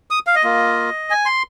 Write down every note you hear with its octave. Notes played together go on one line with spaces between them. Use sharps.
D#6
F5
D#5
A#3 F4
G#5
C6